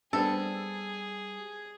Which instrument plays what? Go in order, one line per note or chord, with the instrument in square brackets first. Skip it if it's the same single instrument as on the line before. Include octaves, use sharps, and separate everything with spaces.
[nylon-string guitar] G3 [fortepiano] B3 C4 D4 [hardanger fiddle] G#4 [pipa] A4